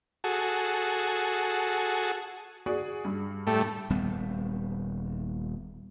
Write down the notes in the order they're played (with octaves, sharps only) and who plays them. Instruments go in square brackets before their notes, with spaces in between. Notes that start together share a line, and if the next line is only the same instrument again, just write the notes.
[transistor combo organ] F#4 G#4 A4
[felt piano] F#4 G#4 D5
G2
[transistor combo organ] A2 G3 A3
[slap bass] D#1 G3 B3